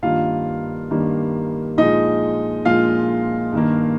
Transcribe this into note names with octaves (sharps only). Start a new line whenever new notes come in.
G2 D#3 G3 A#3 F4 F5
G2 D#3 G3 A#3
A#2 F3 G#3 D#4 D#5
A#2 F3 G#3 F4 F5
G2 D#3 A#3